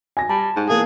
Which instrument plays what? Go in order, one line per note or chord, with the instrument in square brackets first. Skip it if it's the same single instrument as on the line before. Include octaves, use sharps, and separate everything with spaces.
[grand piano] G#5 A#6
[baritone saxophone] G3 [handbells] A5
[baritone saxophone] G#2
[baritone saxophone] E2 [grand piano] A#3 [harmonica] G#4